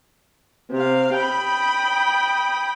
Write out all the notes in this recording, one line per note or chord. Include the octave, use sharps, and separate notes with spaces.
C3 F5
G5 B5 D#6